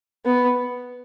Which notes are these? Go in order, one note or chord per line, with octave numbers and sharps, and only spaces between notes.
B3